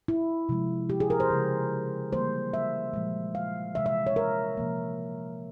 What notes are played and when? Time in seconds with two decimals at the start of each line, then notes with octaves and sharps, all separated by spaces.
0.08 E4
0.49 C3 F3 G#3
0.90 G4
1.00 G#4
1.10 A#4
1.20 C5
1.30 C#3 F3 G#3
2.13 E3 G3 A#3 C5
2.54 E5
2.94 A#2 F3 G#3
3.35 F5
3.75 C3 E3 G#3 E5
3.86 E5
4.07 C#5
4.16 A#4
4.57 C3 F3 A#3